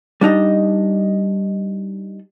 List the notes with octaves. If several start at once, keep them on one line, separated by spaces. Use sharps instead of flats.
G3 D4 D#4 D#5